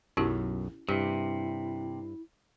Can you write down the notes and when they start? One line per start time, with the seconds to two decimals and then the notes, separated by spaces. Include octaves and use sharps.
0.17 B1 F#2 C#4 E4 G4
0.89 G2 C3 E4 G4